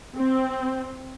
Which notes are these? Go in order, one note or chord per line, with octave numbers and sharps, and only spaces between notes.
C4